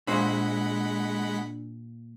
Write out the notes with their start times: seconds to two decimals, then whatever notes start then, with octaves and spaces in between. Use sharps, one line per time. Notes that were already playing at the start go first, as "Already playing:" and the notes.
0.07 A#2 G#3 D4 C5 F#5 B5